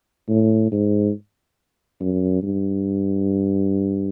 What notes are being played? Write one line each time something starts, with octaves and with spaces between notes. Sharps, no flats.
A2
G#2
F#2
G2